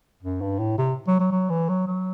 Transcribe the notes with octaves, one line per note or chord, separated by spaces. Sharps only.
F#2
G2
A2
C3
F#3
F#3
F#3
E3
F#3
F#3